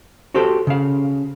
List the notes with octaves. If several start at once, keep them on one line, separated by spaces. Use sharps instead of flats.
F#4 G4 A4 C5
C#3 F5